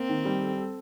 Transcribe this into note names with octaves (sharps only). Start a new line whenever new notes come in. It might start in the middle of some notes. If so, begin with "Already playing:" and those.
Already playing: A#3 C4
D#3
G3
A4
A4